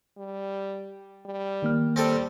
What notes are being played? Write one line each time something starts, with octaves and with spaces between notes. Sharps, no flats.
G3
G3
D#3 A#3 F6
G3 C4 A4 D5